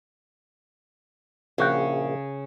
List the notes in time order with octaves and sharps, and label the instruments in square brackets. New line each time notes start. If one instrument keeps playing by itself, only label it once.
[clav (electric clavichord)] A#1 F#4 G5 [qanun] C#3